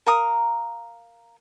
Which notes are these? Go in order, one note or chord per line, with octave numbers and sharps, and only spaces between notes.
A#4 F5 A#5 D#6